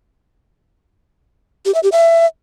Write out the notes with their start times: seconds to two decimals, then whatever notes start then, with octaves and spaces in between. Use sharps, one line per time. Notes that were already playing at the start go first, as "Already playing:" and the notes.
1.66 G4
1.74 E5
1.83 G4
1.92 E5